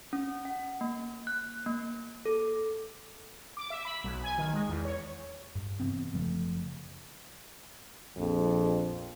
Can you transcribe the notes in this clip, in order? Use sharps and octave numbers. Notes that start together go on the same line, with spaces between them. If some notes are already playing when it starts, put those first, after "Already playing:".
C#4
F#5
A#3
F#6
A#3
A4
D6
E5
B5
B1
G#5
D#3
G#3
E2
C#5
G2
C3 E3 B3 C4
F#1 C#3 F3 A3
A#1 F2